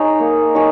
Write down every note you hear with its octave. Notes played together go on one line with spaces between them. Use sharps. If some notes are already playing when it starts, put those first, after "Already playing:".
Already playing: D#4 G#4 C#5
A#3
D#4 G#4 C#5